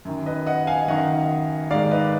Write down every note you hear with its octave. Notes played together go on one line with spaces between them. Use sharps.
F#2 D#3
B4 D#5
D#5 F#5
F5 G#5
F#2 D#3 D#5 F#5
G#2 D#3 D5 F5
B4 D#5